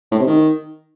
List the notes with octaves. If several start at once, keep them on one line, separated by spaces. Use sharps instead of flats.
A2
C3
D#3